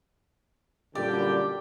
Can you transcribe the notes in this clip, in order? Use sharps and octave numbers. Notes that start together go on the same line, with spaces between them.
F#2 A#2 D3 G3 G4 D5 G5